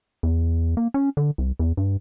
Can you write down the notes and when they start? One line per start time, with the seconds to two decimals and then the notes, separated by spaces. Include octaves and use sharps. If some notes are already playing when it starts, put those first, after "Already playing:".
0.23 E2
0.77 A#3
0.94 C#4
1.17 D3
1.38 C2
1.59 E2
1.77 G2